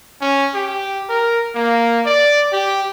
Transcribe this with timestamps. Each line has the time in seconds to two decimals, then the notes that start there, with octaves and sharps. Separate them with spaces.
0.21 C#4
0.54 G4
1.09 A#4
1.55 A#3
2.06 D5
2.52 G4